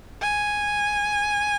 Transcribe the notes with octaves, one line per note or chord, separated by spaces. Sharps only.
G#5